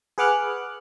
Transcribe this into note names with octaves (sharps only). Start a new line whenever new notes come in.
G#4 B4 F#5 D6 F6 F#6